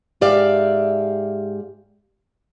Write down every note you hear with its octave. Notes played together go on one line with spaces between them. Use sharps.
G#2 G4 D5 E5 F5